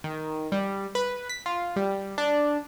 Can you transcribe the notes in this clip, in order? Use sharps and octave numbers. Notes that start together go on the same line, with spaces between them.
D#3
G3
B4
B6
F4
G3
D4